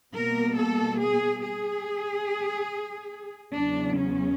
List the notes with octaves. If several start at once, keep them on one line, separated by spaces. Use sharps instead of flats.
B2 G3 A#3 A#4
A4
G#4
G#4
E2 C#3 F#3 D4
C#4